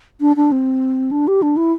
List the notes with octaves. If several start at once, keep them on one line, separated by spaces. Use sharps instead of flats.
D4
D4
C4
D4
G4
D4
E4